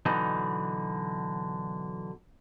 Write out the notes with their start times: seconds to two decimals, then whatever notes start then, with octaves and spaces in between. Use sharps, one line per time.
0.06 B2 D3 E3 F#3 D#4